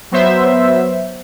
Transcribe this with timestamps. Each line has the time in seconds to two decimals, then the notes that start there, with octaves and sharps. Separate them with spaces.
0.12 F#3 B3 C5 E5